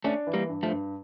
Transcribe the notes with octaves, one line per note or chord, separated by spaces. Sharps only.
A3 C#4 D4
E3
G3 A#3
G2
F3 A3
G2